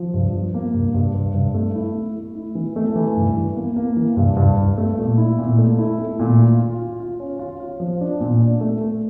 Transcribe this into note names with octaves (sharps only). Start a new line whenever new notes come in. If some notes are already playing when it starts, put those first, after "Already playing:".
Already playing: F3
G2
F3
A#3
G2
G2
G2
G2
A3
E4
A3
A3
E4
E3
A3
E3
G2
E3
A#3
A#3
E3
G2
G2
G2
A3
A#2
E4
A#2
A3
E4
A3
A#2
F4
F4
F4
F4
C#4
F4
F4
F3
D4
A#2
D4
A3
A3